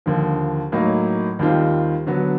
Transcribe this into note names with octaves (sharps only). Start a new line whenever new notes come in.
D#2 D3 F3
A2 F#3 A#3 D#4
D#2 D#3 G3 C4 F4
D3 F#3 B3